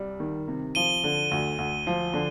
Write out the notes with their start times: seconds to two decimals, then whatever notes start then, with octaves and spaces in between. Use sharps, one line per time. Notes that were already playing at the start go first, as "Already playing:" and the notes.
Already playing: C2 G3
0.20 D#3
0.48 C3
0.75 F3 D#7 G7
1.04 D3
1.31 D2
1.58 D2
1.87 F3
2.14 D3